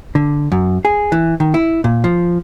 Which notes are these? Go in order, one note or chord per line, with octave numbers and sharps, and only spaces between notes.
D3
F#2
G#4
E3
D#3
E4
A#2
F3